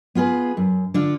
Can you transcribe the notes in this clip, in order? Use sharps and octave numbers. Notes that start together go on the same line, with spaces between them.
B3 F4 G#4 B4
F#2
D3 D4 F4